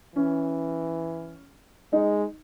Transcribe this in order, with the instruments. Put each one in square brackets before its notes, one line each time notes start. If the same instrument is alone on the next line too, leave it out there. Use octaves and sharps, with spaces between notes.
[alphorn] E3 [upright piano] C#4
[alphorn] G#3 [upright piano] D#4